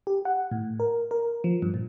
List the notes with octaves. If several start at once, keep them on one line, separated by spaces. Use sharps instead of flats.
G4
F#5
A2
A#4
A#4
F3
G2
A#2